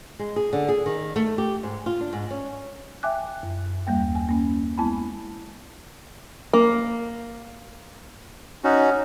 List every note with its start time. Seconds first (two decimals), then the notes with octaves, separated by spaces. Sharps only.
0.19 G#3
0.36 G#4
0.53 D3
0.69 G#4
0.86 D#3
1.16 A3
1.38 G4
1.63 G#2
1.86 F4
2.01 D4
2.13 G#2
2.30 C#4
3.03 E5 G5 G#5 D6 F#6
3.43 F#2
3.87 D#2 G3 A#3 G5
4.15 G#5
4.29 A#3 C#4
4.77 G#3 B3 E4 G#5 A5 B5
6.53 A#3
8.64 C#4 D#4 F#4